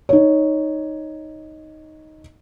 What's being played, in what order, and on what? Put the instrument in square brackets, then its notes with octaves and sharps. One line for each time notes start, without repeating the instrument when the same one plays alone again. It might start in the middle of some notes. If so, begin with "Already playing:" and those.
[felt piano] D#4 C#5